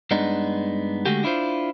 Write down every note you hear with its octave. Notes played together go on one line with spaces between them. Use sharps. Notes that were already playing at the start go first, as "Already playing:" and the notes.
G2 G#3 B3 D4 D#4
D3 G#3 A3 F#4 G4
D4 E4 F4 C5